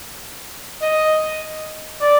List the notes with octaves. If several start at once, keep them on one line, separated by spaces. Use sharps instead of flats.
D#5
D5